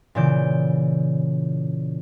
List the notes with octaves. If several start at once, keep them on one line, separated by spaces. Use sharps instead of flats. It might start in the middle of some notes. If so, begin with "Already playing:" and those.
A#2 C#3 E3 D5 G6 D7